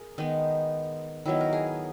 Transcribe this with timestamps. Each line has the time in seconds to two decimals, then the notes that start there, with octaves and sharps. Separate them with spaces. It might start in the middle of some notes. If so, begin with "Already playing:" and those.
Already playing: G#4 A#4
0.18 D#3 G#3 B3 D#4
1.26 D#3 F#3 B3 E4
1.41 A#4
1.53 G#4